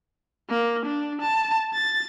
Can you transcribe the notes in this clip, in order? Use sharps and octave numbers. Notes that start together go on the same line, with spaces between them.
A#3
D4
A5
A6